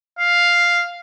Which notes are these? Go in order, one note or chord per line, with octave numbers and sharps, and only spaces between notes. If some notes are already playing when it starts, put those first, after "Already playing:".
F5